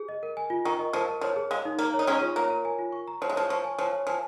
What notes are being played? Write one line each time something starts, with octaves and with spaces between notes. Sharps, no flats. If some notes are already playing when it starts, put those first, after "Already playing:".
Already playing: G#4
D#5
A#4
G#5
F4
D#3 C#6
D#5
F3 A#4
A#4
F3 C#5
G#4
G#3 F5
D#4
A#3 A#5
C#5
D#4
G#3 C#4 C#6
F4
A#3 C#5
A#4
G#5
F4
C#6
A#5
F3 C#5
G#3
F3 C#5
F3 C#6
G#5
F3 C#5
C#5
F3 G#5